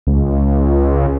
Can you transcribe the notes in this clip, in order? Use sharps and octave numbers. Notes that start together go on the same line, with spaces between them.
C#2